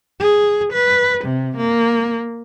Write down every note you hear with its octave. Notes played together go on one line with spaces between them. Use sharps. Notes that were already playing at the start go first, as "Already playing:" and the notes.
G#4
B4
C3
A#3